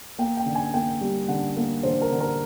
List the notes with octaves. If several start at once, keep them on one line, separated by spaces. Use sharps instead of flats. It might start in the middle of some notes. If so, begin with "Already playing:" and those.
A#3 G5
G5
D3
G#5
A#3 G5
G3
D3 F#5
A#3
D3 C5
A#4
D3
A#4